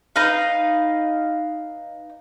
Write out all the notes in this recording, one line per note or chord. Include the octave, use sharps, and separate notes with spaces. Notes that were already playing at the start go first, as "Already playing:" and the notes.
D#4 B4 F5